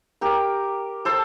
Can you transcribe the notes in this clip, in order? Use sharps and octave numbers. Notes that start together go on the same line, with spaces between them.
G4 A#4
A4 C5